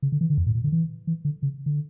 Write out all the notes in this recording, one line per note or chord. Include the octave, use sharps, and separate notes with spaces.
C#3
D3
E3
D3
F2
A2
A#2
D3
E3
E3
D3
C#3
D3